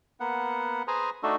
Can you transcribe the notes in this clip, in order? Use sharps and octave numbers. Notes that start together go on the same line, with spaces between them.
A#3 B3 F#5
G#4 B4 C5 G#5 A#5
A3 D4 D#4 F#4 A4